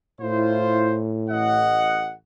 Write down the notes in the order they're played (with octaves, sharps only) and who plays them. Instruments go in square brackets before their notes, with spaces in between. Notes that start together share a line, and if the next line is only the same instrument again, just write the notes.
[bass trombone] A2 [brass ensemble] E4 F4 C5
[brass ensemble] A1 D#5 F#5